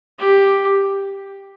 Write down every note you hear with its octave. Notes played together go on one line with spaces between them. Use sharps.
G4